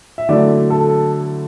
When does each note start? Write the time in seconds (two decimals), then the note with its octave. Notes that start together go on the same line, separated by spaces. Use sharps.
0.18 E5
0.28 D3 F#3 A3 E4 D5
0.70 A4